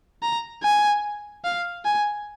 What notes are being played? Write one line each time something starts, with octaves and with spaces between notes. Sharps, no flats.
A#5
G#5
F5
G#5